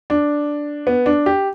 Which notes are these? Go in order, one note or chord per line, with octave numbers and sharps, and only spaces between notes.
D4
B3
D4
G4